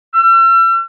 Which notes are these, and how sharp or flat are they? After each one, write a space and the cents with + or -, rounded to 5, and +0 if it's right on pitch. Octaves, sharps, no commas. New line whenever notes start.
E6 +40